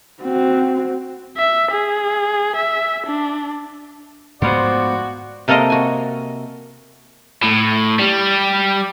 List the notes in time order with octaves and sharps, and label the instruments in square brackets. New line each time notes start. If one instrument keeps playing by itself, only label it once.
[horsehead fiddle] C4 F#4
[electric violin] E5
G#4
E5
D4
[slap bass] G#2 G#3 A3 [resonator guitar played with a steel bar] F3 B3 C5 [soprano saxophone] F#4 [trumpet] D5
[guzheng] C3 A#3 A4 A#4 D#5 C6
F#4 G#5
[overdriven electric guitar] A2
G3